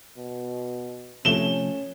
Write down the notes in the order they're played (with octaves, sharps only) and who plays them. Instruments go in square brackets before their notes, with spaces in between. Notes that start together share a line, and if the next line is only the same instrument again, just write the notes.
[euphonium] B2
[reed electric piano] C3 F3 A3 [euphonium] C#4 [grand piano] E7 G7